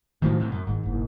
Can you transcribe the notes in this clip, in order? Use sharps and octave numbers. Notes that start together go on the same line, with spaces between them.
A2 D#3 F3 F#3 C4
D2 C3
F#2
G#1 G#2 D#3
F#1 B1